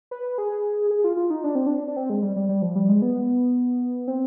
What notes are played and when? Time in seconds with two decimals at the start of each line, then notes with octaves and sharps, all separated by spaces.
0.11 B4
0.38 G#4
0.91 G#4
1.04 F4
1.17 F4
1.30 D#4
1.44 D4
1.55 C4
1.67 D4
1.88 D4
1.96 C4
2.10 G#3
2.22 G3
2.36 G3
2.49 G3
2.62 F3
2.75 G3
2.89 G#3
3.02 B3
4.08 C4